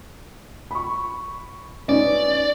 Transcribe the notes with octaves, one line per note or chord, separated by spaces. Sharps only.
B5 C#6
C#4 D#4 B4 D5